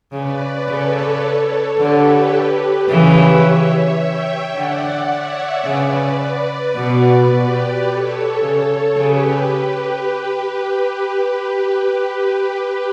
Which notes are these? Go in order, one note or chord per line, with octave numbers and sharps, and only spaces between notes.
C#3 B4 D5
C#3 A4 C#5
D3 G4 B4
C#3 E3 C#5 E5
E5 G5
D3 D5 F#5
C#5 E5
C#3 B4 D5
B2
G4 B4
A4 C#5
C#3
C#3 G4 B4